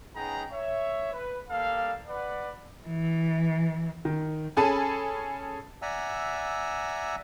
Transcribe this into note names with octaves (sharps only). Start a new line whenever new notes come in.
B3 C#4 D#4 G#4 G5 A#5
C#5 E5
B4
G3 A#3 A4 F5
B4 D5 F#5
E3
D#3
C#4 G#4 A4 G#5 A5 B5
D5 E5 F#5 G#5 A#5 E6